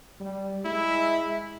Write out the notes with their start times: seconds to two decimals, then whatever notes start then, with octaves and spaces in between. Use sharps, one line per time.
0.20 G3
0.65 G#3 E4 E5